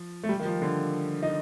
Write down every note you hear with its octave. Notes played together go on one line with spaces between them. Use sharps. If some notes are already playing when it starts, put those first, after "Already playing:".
Already playing: F3
A3
G3
D#3
F3
D3
D#4